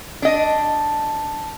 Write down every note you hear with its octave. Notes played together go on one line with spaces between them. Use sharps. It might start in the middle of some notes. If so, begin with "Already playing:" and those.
D4 D#5